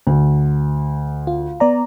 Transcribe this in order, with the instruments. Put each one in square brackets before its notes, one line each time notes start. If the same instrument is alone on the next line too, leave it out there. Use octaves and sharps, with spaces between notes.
[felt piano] D2
[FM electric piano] F4
B3 D5 A#5